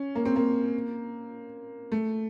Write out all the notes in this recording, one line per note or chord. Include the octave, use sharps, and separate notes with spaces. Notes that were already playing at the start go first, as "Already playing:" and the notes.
Already playing: C#4
A#3
C4
A#3
A3